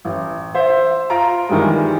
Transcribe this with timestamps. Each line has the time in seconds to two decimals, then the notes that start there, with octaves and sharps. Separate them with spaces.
0.05 A1
0.55 C5 E5
1.10 F4 A#5 D7
1.49 D#3 E3 G3 G#3